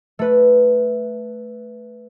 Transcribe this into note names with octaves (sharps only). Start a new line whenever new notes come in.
A3 B4